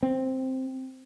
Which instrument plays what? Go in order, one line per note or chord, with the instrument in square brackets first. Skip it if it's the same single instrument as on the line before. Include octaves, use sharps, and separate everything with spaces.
[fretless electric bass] C4